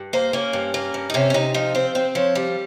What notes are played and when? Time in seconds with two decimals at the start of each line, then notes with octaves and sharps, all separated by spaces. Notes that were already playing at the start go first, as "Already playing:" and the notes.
Already playing: G2
0.13 A#3 C5
0.33 A#3 C#4
0.53 G2
0.74 A#3
0.94 G2
1.10 D#4
1.14 C3 C#4
1.30 C#4
1.34 C3 D#4
1.54 F3 D#4
1.75 C4 C5
1.95 C4 C5
2.15 F3 C#5
2.35 G3